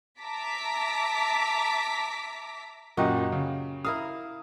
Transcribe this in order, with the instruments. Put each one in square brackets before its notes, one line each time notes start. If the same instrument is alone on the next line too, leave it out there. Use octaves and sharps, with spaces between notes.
[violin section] E5 A5 A#5 D6 B6
[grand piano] F#2 A#2 D#5 [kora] F#4 G4
[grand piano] C#3
[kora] E4 A#4 F5 [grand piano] D#6